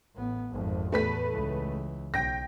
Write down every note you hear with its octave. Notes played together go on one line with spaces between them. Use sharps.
A1 B3
G#1 F2
E2 A2 A3 B4 B6
C#2 E3
B1 G5 A#6